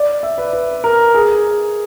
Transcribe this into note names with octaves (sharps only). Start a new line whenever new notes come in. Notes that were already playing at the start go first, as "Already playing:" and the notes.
Already playing: D5
E5
B4
B4
A#4
G#4